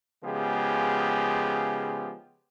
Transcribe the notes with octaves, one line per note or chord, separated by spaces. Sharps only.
C#3 F3 G#3 B3 G4 G#4